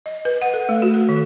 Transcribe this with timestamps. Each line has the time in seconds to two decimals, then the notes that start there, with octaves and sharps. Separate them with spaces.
0.06 D#5
0.25 B4
0.42 F#5
0.54 A4
0.69 A3
0.82 F#4
0.94 A4
1.09 D#3